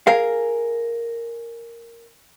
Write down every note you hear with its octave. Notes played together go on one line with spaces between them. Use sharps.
G#4 A#4 F5